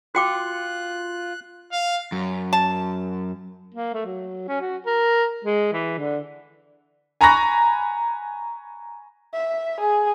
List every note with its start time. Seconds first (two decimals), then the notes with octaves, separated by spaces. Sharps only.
0.15 F4 F#4 G5 D6 F#6
1.72 F5
2.12 F#2
2.53 A5
3.74 A#3
3.94 A3
4.06 F#3
4.48 C#4
4.61 F#4
4.86 A#4
5.44 G#3
5.73 E3
5.98 D3
7.21 G#5 A#5 B5 C#6 F#6 A#6
9.33 E5
9.80 G#4